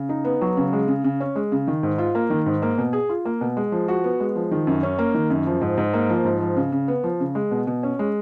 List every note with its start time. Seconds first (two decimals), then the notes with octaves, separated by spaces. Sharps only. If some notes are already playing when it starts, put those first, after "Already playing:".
Already playing: C#3
0.09 D#4
0.24 B3
0.41 F#3
0.57 C#3
0.73 G#3
0.88 C#3
1.04 C#3
1.20 C#4
1.36 G#3
1.52 C#3
1.67 D#3
1.83 G#2
1.98 F4
2.15 A#3
2.30 D#3
2.46 G#2
2.62 A#3
2.78 B2
2.93 G#4
3.09 F4
3.25 A#3
3.41 B2
3.57 G#3
3.72 F3
3.88 F#4
4.04 B3
4.20 G#3
4.36 F3
4.51 D#3
4.67 F#2
4.83 C#4
4.99 A#3
5.14 D#3
5.30 F#2
5.46 F3
5.61 G#2
5.77 G#2
5.93 A#3
6.10 F3
6.25 G#2
6.41 F3
6.56 C#3
6.72 C#3
6.88 B3
7.04 F3
7.20 C#3
7.35 G#3
7.51 B2
7.67 B2
7.83 C#4
7.99 G#3